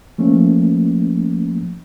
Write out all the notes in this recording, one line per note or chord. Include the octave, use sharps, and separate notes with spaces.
F3 A3 A#3 C#4